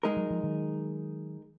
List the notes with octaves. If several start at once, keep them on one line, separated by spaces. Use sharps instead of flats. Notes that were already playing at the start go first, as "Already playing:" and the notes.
G#3 D#4 A#4
F#3
F3
D#3 F#3